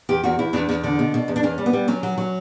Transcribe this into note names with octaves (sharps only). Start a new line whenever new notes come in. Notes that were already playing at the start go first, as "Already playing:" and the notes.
E2 G4
E2 F#4
E2 E4
E2 D4
E2
D3
B2
B2
E2
D4
E2 C#4
G3
B3
G3
F#3 C#4
F#3
F#3